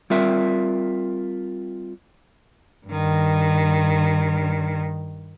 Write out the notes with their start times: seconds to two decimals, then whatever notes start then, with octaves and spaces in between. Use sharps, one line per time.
0.10 G3 C4 F4 A#4 E5
2.87 G2 D#3